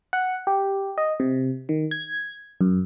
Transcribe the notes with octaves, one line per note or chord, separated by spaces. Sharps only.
F#5
G4
D#5
C3
D#3
G#6
F#2